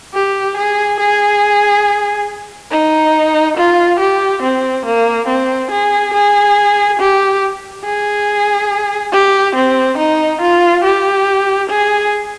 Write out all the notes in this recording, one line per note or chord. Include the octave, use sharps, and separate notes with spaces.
G4
G#4
G#4
D#4
F4
G4
C4
A#3
C4
G#4
G#4
G4
G#4
G4
C4
D#4
F4
G4
G#4